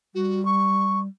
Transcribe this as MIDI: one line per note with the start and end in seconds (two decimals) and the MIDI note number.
0.15 1.07 55
0.15 0.44 66
0.45 0.99 85